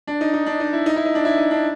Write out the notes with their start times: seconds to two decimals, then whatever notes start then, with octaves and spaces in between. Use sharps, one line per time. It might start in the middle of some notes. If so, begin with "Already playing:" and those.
0.07 D4
0.21 D#4
0.34 D#4
0.46 D4
0.60 D#4
0.73 E4
0.86 D#4
0.96 E4
1.05 D#4
1.15 D4
1.25 E4
1.38 D#4
1.51 D4